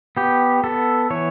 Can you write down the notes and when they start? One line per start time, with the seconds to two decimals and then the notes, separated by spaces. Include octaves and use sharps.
0.17 B3 G4
0.64 B3 A4
1.10 E3 C#5